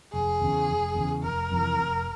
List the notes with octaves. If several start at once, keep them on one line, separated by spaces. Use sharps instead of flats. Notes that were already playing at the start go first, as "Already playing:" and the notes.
F1 G#4
E2 C#3
F1
E2 C#3
F1 A#4
F2 C3 E3
F1